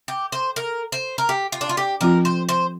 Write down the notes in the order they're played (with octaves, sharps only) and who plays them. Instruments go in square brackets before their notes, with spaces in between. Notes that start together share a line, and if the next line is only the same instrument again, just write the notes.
[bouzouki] G4
C5
A#4
C5
A#4
G4
F4
D4
F4
G4
[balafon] F3 C4 F4 [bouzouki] A#4
[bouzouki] C5
C5